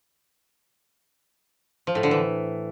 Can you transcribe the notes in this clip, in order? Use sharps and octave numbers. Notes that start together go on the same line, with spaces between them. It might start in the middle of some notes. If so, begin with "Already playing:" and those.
F3
A2
D3
E3